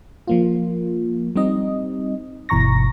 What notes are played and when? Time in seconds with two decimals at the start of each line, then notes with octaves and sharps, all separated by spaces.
0.28 F3 A#3 F4
1.36 G3 C4 D#4 D#5
2.49 G1 B2 E3 A#5 C#6 A#6